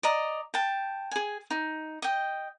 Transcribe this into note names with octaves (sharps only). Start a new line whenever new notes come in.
D5 D#5 A#5
G5 A5
G#4 G#5
D#4
D#5 G5